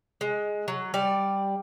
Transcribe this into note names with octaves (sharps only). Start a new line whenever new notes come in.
G#3
F#3
G3 D5